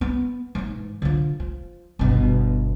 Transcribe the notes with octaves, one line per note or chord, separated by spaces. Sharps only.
B3
G#2 E3
D3 F3
F3
G1 B2